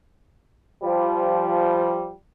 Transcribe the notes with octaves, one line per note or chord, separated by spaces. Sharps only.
F3 G3